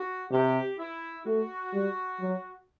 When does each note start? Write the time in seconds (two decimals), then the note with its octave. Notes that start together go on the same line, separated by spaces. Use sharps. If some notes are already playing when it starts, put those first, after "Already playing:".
Already playing: F#4
0.30 C3 G4
0.77 E4
1.25 A3 F#4
1.73 G3
2.20 F#3